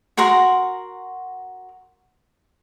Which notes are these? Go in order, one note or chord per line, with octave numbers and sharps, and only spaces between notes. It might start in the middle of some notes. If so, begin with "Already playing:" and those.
F#4 A#4 F#5 C6